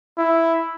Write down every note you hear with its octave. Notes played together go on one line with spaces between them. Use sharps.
E4